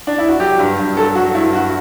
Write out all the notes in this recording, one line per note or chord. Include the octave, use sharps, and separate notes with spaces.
D4
E4
F#4
F#3 G4
G2
G2
F#3 A4
F#3 F#4
G2 E4
G2 F#4